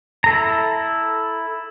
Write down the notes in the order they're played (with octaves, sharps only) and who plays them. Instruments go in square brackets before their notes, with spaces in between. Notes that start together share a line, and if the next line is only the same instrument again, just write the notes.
[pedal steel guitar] E4 A4 A#5